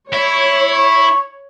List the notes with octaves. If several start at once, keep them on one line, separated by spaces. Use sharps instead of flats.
E4 C#5
C#6